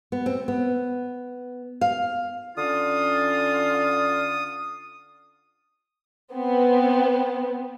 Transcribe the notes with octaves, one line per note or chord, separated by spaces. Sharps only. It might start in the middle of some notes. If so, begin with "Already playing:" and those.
B3
C4
B3
F5
D3 C#4 F4 D#6
B3 C4